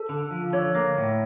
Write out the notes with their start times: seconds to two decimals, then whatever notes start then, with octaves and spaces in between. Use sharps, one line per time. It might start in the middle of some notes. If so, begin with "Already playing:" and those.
Already playing: A4
0.09 D3
0.31 F3
0.53 D3 C#5
0.75 A#3
0.97 A2